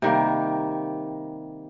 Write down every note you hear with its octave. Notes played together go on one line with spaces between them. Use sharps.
C3 D#3 G3 A#3